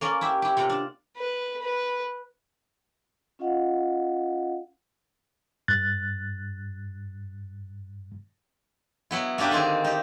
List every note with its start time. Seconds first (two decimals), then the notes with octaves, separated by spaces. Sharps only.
0.01 A#3 C#4 A#4 D5
0.21 E4 G4 E5
0.42 E4 G4
0.57 C3 F4 F#5 A#5
0.70 D4
1.17 B4
1.62 B4
3.39 C#4 F4 D#5 F5 F#5
5.68 G2 F#6 A6
9.11 F#3 B3 E4
9.38 A#3 C#4 D4 G4 B4
9.51 D3 D#3 C4 G#4
9.84 D#4 G4